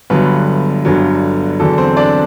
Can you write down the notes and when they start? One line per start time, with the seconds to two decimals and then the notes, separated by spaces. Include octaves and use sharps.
0.10 G1 G2 D3 F#3 B3 B4
0.85 G1 G2 D3 F#3
1.60 E2 D3 F#3 A4
1.78 C4 C5
1.97 D4 D5